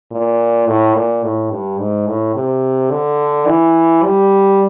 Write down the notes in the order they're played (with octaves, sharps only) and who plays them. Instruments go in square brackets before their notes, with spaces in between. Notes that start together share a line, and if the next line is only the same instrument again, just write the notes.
[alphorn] A#2
A2
A#2
A2
G2
G#2
A2
C3
D3
E3
G3